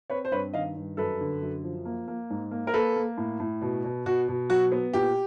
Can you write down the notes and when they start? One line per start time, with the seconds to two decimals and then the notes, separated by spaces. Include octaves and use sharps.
0.10 C4 B4 C#5
0.25 C5
0.31 G2 B4 C#5
0.53 D#3 D#5 F5
0.76 G2
0.97 F#2 A4 B4
1.20 D3
1.42 F#2
1.64 F3
1.85 A#3
2.08 A#3
2.30 G#2
2.51 A#3
2.67 A#4
2.74 A#3 A4 B4
2.96 A#3
3.18 A2
3.40 A2
3.61 B2
3.84 B2
4.06 B2 F#4
4.28 B2
4.50 F#3 F#4
4.72 B3
4.93 A#2 G4